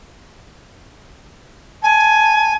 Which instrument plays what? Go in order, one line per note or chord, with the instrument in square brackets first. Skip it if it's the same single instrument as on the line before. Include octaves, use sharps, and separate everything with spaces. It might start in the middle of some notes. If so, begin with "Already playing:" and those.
[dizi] G#5 [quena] A5